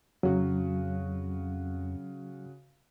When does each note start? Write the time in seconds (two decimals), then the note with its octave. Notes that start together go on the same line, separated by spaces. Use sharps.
0.23 F2 C#3 F#3 F#4